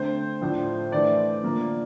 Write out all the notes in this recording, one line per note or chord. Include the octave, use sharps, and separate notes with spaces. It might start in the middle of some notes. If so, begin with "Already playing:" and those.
Already playing: D3 A3 C4 C5
A2 F3 A3 D4
E3 A3 D4 D5
D3 F3 A#3